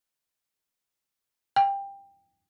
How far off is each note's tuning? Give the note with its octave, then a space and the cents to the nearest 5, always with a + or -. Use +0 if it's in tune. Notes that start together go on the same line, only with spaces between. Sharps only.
G5 +20